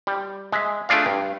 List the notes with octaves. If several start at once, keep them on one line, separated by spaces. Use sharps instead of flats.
G3
G#3 E5
A3 D4 F4 G#4 D5 F5
G2